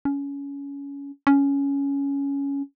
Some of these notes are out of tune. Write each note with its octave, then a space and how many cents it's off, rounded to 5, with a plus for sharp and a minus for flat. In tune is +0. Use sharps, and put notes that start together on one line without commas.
C#4 +20
C#4 +10